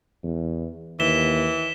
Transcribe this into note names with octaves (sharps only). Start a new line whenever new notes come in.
E2
D#2 E3 B6 E7 G7